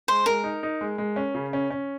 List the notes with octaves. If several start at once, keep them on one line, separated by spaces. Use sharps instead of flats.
G#3 C5
G#3 A#4
D#4
D#4
G#3
G#3
C#4
C#3
C#4
C#4